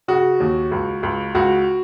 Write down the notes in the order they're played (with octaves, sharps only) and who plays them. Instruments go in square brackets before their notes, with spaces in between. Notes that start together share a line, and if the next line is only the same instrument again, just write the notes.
[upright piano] C#3 F#4
D#2
C#2
C#2
C#2 F#4